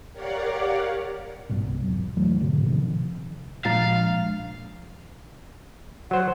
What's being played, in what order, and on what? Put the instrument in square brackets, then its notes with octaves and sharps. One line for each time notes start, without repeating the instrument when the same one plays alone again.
[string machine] G4 A#4 C#5 D5 F5 F#5
[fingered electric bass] G#1 G2 B2
C2
E2 F#3
B2 E3 F#3 A3
G#2 B2 D3
C3 D#3 F3
[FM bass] A#2 [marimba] F3 A6 [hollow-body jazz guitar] G#3 D4 A#5 [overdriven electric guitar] F5
[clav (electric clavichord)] F#3 C5 [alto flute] F#5